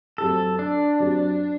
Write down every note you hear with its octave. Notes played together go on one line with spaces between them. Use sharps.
F#2 F#3 C4 G4 A4
D4
F#2 F#3 C4 G4